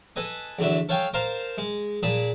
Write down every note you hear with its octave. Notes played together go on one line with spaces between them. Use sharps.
A4 B4 D#5 G#5
E2 D3 F#3 E5
A4 C#5 F5 G5 G#5
A#4 C5 F5 A5
G#3
A#2 G#4 A5 B5